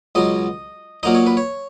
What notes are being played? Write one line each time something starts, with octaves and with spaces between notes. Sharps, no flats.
C#2 B2 F#3 D#5
A#2 F#3 A#3 D#4 D#5
C#5
B4
C#5